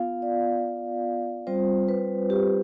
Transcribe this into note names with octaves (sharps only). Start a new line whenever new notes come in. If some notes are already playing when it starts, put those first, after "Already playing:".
Already playing: B3 F4 F5
D5
G3 C4 F4 C5
B4
G4